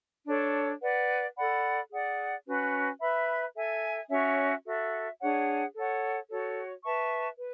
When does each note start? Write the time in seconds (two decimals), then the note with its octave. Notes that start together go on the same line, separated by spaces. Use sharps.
0.26 D4 A4 C#5
0.81 B4 D5 F#5
1.36 A4 D5 F#5 B5
1.91 G#4 D5 F#5
2.46 C#4 F#4 B4
3.00 B4 E5 B5
3.55 A4 E5 G#5
4.10 C#4 F#4 C#5 E5
4.65 F#4 A4 E5
5.20 D4 G#4 C#5 F#5
5.75 A4 C#5 F#5
6.29 F#4 A4 C#5
6.84 B4 E5 A5 C#6
7.39 B4